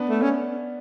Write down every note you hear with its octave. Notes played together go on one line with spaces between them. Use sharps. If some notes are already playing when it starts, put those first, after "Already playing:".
Already playing: B3 D4
A3
C#4